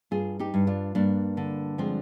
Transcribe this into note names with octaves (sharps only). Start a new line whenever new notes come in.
G2 F4 G#4
D#4 G4
G2
D4 F4
G2 A#3 D4
D3
F3 G#3 C4